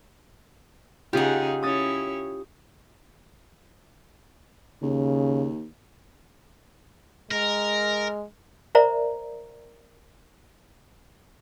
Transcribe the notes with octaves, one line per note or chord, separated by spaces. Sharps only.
C#3 D#4 F4 G4 G#4 F#5
C#4 E4 C#5 D#6 A6
D#2 C#3
G#3 A#4
A#4 C5 D5 E5 A#5